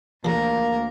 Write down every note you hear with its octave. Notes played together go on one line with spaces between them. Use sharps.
D2 C#3 F3 A#3 A#4